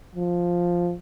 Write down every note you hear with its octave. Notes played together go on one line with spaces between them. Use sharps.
F3